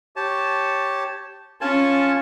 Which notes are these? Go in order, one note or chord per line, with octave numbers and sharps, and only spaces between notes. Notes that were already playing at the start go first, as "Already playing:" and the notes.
G4 C#5 A5
C#4 F4 G#5 A5 C#6